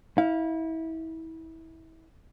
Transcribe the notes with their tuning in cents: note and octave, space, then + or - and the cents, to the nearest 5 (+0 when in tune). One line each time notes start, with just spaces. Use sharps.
E4 -30 F5 +0